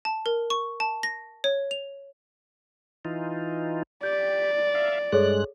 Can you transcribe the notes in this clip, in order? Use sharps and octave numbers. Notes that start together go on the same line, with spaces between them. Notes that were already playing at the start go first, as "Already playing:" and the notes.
A5
A#4
C#6
A5
A#6
C#5
F7
E3 D#4 F4
G4 D5 G6
E5 F5
G2 G#3 G#4 A4 C#5 F#6